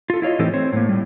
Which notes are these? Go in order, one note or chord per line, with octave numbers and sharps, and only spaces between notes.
F4 A4
E4 F4 C#5 D#5
A2 E3 C4 D#4 G4 A4
C4 C5 C#5
A2 A#3
A2 G3